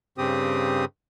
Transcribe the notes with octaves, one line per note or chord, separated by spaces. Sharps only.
G2 C#3 C4 G4 D#6